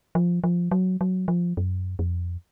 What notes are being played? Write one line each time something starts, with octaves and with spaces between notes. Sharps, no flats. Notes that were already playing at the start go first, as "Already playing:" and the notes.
F3
F3
F#3
F#3
F3
F#2
F2